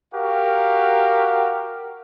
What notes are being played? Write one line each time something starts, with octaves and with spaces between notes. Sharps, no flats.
F#4 G4 A#4 F5